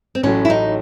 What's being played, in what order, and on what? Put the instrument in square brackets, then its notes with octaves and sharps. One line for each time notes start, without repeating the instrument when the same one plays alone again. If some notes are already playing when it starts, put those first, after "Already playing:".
[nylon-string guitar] C4
[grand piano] A1 A2 F#3 A3 [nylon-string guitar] C#4
[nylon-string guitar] E4
D#4